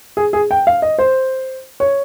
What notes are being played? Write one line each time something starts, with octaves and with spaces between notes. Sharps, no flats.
G#4
G#4
G5
F5
D#5
C5
C#5